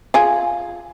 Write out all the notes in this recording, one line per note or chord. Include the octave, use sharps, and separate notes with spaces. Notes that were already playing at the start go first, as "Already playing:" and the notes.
F4 G#4